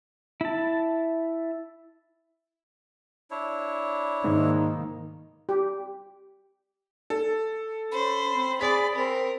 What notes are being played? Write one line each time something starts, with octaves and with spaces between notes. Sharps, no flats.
E4 A5
D4 E4 C#5
G#2 D#3 A#3
G4
A4
C#4 C5 B5
C4
G#4 D5 B6
C4 A#4